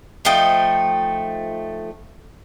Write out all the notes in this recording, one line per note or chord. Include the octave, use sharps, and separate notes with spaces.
F3 A3 D#4 G5